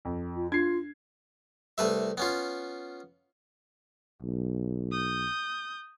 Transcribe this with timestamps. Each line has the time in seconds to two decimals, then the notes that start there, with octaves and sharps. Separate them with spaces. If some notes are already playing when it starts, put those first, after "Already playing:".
0.05 F2
0.36 F4
0.52 D4 F4 G#6 C7
1.78 C2 A3 B4 E5
2.17 B3 C#4 F4
4.22 B1
4.92 D#6 G6